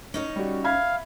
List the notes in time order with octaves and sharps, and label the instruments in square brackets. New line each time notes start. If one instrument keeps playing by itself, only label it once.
[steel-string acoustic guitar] C#4 D#4 C#5
[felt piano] G3 F#4
[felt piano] E5 B5 G#6 [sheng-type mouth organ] F5